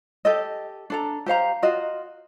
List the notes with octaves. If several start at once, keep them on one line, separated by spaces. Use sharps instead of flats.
G4 A4 D#5
D4 A4 A#5
G4 C5 F5 A#5
F4 F#4 D#5